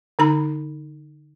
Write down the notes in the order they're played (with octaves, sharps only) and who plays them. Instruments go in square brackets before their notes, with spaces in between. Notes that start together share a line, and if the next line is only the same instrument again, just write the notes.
[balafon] D3 D#4 A#5 B5